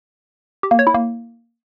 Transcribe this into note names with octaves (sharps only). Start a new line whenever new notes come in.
G4
A#3
C#5
E4
A#3